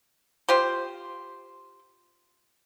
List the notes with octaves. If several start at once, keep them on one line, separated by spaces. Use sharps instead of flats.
F4 G4 C5